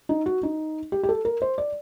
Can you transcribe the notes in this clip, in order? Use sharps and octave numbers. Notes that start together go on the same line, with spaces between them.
D#4
F#4
D#4
G4
G4
A4
A#4
C5
D5